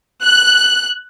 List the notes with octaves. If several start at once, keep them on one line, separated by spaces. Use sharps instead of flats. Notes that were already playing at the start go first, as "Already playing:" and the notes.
F#6